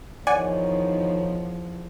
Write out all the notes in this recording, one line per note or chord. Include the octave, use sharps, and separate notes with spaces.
E2 D#3 F3 D#4 C#5 D5 F#5 G#5